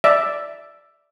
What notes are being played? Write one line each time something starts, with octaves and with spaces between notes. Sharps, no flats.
D5 E5